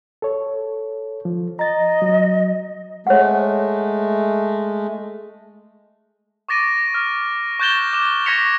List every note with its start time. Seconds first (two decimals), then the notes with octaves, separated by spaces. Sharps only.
0.22 A4 C#5
1.25 F3
1.59 D#5 A#5 A6
2.02 F#3
3.07 G#3 A3 C#5 F#5
6.49 C#6 D6 A6 A#6 D7 D#7
6.94 F6
7.60 C#6 F#6 G6 A6 E7 G7
7.93 D6 G6 E7
8.26 C#6 G#6 A#6 B6 C#7 F7